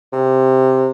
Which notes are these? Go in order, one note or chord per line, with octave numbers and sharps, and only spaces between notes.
C3